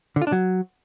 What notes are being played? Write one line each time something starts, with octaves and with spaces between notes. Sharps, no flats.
D3
F4
D4
F#3